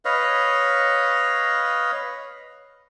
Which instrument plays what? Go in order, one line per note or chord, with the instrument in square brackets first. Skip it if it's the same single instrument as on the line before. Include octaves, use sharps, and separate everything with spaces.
[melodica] B4 C#5 D#5 F5